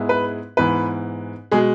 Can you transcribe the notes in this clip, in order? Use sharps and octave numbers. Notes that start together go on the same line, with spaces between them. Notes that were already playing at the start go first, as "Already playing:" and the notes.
Already playing: G#2 G#3 B3 E4
B4
G#2 E3 B3 B4
B2 G#3 G#4